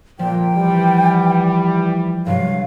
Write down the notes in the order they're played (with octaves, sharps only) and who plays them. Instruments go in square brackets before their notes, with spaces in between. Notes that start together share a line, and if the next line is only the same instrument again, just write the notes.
[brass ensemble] A#2 [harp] F3 [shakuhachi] G5
[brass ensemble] E3 G3
[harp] G2 C3 F#3 [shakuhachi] F5